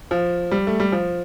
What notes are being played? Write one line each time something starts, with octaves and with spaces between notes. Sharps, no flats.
F3
G3
A3
G3
F3